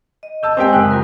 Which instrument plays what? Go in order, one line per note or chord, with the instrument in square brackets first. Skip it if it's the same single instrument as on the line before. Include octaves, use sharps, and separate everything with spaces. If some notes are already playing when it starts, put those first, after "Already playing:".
[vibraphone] D#5
[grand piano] A5 E6 G6
[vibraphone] G#3 G#5 D#6 [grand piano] C4 G4 G5
[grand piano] F#1 F#6
[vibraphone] F4 A#4 A#5